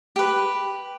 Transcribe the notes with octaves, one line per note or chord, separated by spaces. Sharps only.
G4 B4